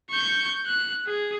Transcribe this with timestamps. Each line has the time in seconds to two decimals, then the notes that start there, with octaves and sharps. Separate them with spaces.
0.10 C#6 G6
0.66 F#6
1.06 G#4